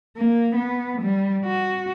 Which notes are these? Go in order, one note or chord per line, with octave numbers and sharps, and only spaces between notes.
A#3
B3
G3
F#4